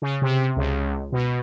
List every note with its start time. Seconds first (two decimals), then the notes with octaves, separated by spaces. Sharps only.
0.02 C#3
0.22 C3
0.56 C#2
1.12 B2